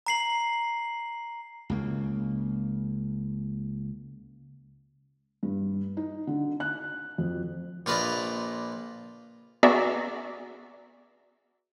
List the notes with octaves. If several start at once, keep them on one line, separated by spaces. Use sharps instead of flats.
A#5 C7 F#7
C#2 C#3 A#3
G2
D#4
D3
F#6
F2
A#1 F4 B4 D5 D#5
B3 F#4 G#4 D5 E5 A#5